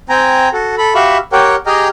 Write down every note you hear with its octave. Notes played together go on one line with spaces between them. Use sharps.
C4 G5 G#5 A#5
F#4 A4
A4 B5
F#4 G4 E5 F5 B5 C#6
G4 A#4 C#5 F#5 G5
G4 G#4 D#5 G5 A#5 F6